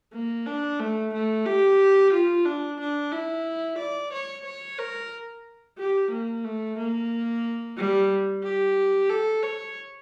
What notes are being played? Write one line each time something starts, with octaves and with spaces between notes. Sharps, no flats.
A#3
D4
A3
A3
G4
F4
D4
D4
E4
D5
C#5
C#5
A#4
G4
A#3
A3
A#3
G3
G4
A4
C#5